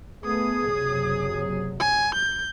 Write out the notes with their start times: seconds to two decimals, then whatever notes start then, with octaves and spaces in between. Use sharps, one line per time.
0.24 A3 B3 G#4 D#6
0.70 F#1 C3 F#3
1.80 G#5
2.14 G6